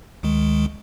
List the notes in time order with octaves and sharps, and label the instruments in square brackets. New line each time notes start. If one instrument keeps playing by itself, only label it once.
[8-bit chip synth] D2 D#3 G#3